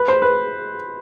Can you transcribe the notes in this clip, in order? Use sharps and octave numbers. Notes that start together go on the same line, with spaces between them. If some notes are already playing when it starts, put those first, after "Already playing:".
Already playing: B4
C5
B4